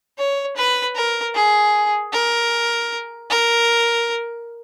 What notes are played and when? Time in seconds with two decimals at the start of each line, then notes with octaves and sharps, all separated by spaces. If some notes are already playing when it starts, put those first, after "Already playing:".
0.18 C#5
0.57 B4
0.96 A#4
1.35 G#4
2.13 A#4
3.30 A#4